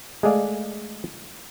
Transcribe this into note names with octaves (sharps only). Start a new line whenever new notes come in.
G#3 A3 G#4 D5 F5